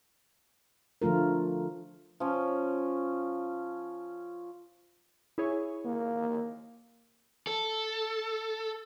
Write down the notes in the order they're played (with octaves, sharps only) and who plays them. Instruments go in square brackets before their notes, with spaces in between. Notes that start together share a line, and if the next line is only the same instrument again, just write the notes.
[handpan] D3 F3 A3 F4 A#4
[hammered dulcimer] F3 C#4
[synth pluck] E4 G#4 C#5
[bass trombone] A#3
[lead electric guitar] A4